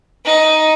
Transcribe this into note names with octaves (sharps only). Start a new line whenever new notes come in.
D#4